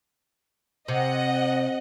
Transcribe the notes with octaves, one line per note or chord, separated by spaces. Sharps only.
C3 D#5 F#5